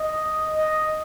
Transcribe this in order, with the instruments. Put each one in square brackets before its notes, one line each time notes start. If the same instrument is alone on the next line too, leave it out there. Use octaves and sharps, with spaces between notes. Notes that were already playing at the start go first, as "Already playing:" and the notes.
Already playing: [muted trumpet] D#5
D#5